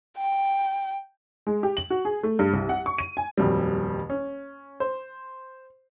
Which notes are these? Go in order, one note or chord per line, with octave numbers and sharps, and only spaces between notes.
G5
G#3
G4
F#7
F#4
G#4
A3
G2
C2
F#5
C#6
D#7
G#5
D#1 F2 F#3 G3
C#4
C5